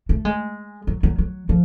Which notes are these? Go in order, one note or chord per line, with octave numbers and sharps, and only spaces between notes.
A3
G#3
F#3
F#3
F#3
F3